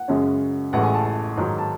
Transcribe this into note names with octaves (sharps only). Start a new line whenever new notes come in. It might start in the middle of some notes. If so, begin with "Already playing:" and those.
Already playing: F#5
F#2 C#3 G#3 C#4
A1 A2 G#3 F#5
G#5
A5
A5
G#2 D#3 F#3
A5